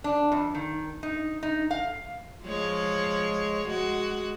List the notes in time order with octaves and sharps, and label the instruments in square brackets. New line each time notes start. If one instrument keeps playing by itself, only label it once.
[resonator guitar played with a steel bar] D4
F2
D#3
D#4
D#4
F5
[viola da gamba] F3 G#3 C#5
G#3 F#4